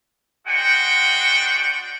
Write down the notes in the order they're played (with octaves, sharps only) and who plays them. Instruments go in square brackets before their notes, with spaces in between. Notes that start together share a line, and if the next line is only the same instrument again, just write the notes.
[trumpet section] G#3 D4 F#4 F#5 G5